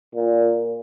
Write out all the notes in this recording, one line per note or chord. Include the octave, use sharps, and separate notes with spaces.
A#2